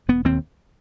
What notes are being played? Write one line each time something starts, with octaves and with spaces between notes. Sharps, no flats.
E1 B3
D#2 C4